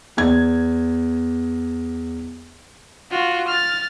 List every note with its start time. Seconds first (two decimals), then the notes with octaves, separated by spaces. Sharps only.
0.17 E2 G#6
3.11 F4 F#4
3.47 F6 A6